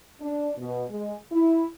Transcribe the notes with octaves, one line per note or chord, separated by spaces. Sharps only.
D4
B2
G#3
E4